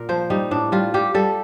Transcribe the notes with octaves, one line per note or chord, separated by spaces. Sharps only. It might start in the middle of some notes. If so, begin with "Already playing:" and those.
Already playing: A#2 A#4
F3 C5
G3 D#4
A2 D4
G3 F4
G3 G4
G3 A4